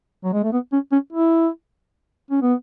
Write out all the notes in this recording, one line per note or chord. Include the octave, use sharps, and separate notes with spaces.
F#3
G#3
A3
B3
C#4
C#4
E4
C#4
B3